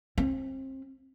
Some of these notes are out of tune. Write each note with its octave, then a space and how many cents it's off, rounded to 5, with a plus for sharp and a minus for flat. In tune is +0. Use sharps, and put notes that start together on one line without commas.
C4 +30